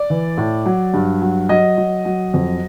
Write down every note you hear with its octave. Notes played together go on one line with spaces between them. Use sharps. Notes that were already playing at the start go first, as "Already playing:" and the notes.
Already playing: D5
E3
A2
F#3
G2
F#3
F#3 D#5
F#3
F#3
F2